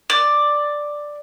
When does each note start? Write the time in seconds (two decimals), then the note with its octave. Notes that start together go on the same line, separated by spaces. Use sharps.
0.10 D5